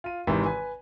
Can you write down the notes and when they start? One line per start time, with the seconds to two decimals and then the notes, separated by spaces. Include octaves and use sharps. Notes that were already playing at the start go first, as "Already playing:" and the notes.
0.04 F4 D#7
0.27 G#1 G#2 C3 D#3 E3
0.46 B4 G#5